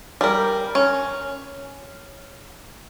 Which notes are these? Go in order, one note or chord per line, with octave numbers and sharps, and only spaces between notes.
G3 A#4
C#4